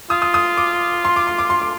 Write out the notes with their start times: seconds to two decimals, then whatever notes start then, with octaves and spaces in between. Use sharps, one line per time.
0.10 F4 D#6
0.22 D#6
0.34 D#6
0.57 D6
1.05 C6
1.16 D6
1.27 C6
1.39 D6
1.50 C6
1.62 D6